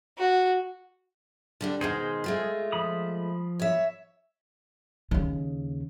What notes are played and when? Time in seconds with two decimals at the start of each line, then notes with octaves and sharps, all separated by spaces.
0.18 F#4
1.61 D3 G3 D4
1.81 B2 D#3 G#3 G#4 C5
2.24 G#3 A3 F4
2.72 F3 B5 D#6
3.60 C#5 E5
5.11 D#2 C#3